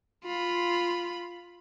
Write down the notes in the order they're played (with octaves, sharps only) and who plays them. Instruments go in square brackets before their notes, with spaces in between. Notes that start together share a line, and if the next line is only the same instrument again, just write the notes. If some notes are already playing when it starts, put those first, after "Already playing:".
[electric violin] F4 B5